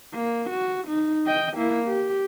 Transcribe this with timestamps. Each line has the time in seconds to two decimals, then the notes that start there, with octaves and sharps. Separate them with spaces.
0.14 A#3
0.50 F#4
0.88 D#4
1.26 D#5 G5
1.57 A#3 E4
1.87 G4